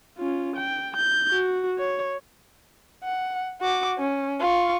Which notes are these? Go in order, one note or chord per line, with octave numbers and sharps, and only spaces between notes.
C#4 F4
G5
G6
F#4
C#5
F#5
F#4 D6
C#4
F4 C#6